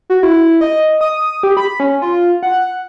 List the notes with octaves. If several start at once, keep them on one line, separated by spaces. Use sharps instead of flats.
F#4
E4
D#5
D#6
G4
B5
C#4
F4
F#5